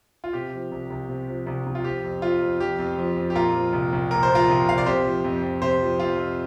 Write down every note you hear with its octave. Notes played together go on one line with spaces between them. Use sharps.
F4
C3 G4
F3
C2
C2
C3
F3
C2
C2
F4
F3 G4
F2
F3 F4
F2
F3 G4
F2
F3
F2
G4
A#2 F4 A#4
F3
C2
C2
A#2 A#4
C5
F3
F4 A#4
C2
C2 F5
D5
C3 G4 C5
F3
F2
F2
C3 G4 C5
F3
F2 F4
F2